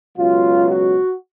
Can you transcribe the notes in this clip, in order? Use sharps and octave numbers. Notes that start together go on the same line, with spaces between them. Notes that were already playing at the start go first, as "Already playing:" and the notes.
C#2 B2 F#3 F4
F#4